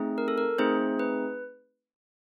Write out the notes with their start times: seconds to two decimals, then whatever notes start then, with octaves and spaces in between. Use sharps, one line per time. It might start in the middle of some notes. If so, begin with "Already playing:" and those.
Already playing: A3 C4 D#4 G#4
0.18 A#4
0.28 A4
0.38 A#4
0.58 A3 C4 D#4 G#4 C5
0.99 B4